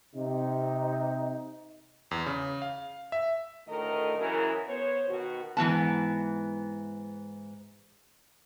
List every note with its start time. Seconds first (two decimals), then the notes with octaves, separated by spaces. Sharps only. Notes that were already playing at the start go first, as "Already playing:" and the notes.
0.15 C3 D#4
2.11 E2
2.26 C#3
2.62 F5
3.12 E5
3.68 D2 A2 D#3 A3 A#4 D#5
4.18 C#3 E3 F#3 E4 G#4 A#4
4.67 B3 C5 C#5
5.09 B2 D#3 F#4
5.57 G#2 E3 B3 A5